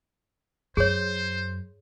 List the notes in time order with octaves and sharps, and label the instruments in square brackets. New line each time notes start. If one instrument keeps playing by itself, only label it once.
[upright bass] F#2 [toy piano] G#4 C#5 [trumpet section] C5